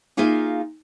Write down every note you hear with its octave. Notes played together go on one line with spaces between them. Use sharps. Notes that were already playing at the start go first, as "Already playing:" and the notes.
A#3 D#4 F4 G#4 E5 F5